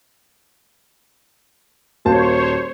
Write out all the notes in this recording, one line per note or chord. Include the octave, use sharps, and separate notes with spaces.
D#1 A#3 F#4 C5 C#5 A5